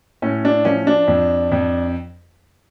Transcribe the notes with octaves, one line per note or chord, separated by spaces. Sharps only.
A2 C#4
D4
F3 C#4
D4
F2
F2